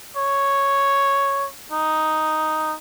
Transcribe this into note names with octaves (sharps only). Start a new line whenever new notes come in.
C#5
D#4